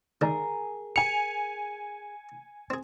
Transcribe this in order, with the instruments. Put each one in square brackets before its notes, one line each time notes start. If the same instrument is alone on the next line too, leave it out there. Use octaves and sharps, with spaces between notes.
[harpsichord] G#2 D3 D#3 [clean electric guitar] G#4 A#4
[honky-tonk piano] G#5 F7 [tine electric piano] C#7
[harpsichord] C4 G#4